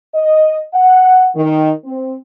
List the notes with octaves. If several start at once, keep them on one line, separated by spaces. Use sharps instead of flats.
D#5
F#5
D#3
C4